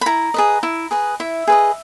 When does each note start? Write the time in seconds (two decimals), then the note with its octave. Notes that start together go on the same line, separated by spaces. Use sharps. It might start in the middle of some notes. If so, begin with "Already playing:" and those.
0.01 B5
0.06 E4 A#5
0.34 G#4 B4 D#5
0.63 E4
0.91 G#4 B4 D#5
1.20 E4 E5
1.47 G#4 B4 D#5